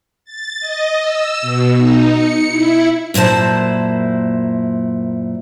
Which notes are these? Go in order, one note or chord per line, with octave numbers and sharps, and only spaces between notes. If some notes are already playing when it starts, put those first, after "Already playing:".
A6
D#5
E6
B2
D#4
C#7
E4
F#2 A#2 E4 C5 A5